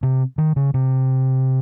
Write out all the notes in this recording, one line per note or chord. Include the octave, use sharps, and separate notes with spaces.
C3
D#3
C#3
C3